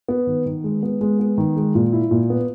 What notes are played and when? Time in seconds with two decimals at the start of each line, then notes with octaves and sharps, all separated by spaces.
0.08 B3
0.27 D#3
0.46 D#3
0.64 G#3
0.83 B3
1.01 G#3
1.19 B3
1.38 D#3
1.56 G#3
1.75 A#2
1.93 E4
2.11 A#2
2.30 B3